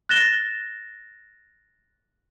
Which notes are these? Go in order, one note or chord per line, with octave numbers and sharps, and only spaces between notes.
F#6 A6 A#6 E7 G7